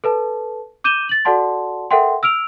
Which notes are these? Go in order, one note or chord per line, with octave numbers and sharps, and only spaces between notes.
A4 B4 A5
D6 G6 D#7 E7 G7
A6 F#7
F#4 A4 D5 F#5 A5 C6
A4 A#4 E5 F#5 G5 C6
E6 F6 D7 F7